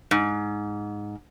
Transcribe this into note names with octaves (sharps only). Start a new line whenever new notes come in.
G#2